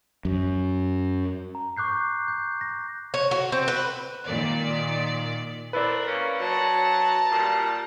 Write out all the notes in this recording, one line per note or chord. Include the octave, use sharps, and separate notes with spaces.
F#2
A#5
C#6 D6 F#6 G6 C7
G6
A#6
C#5
F#4
C4
B4
A#2 D#3 D5
A3 C4 E4 A#4 B4 D5
A#3 C#4
F#3 A5 A#5
A#2 G3